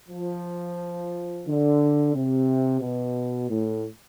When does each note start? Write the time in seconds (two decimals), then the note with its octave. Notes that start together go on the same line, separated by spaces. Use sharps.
0.09 F3
1.46 D3
2.14 C3
2.81 B2
3.50 A2